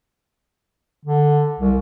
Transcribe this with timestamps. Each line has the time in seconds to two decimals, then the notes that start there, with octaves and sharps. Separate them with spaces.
1.06 D3
1.59 C2